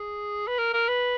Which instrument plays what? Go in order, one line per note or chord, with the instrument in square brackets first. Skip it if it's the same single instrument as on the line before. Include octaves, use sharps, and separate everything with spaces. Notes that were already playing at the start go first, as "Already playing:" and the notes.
Already playing: [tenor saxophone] G#4
B4
A#4
A#4
B4